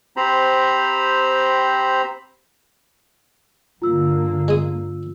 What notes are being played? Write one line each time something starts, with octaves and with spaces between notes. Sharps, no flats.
C4 G4 C5 A#5 B5
G2 D3 A#3 F4 E6
G#3 D#6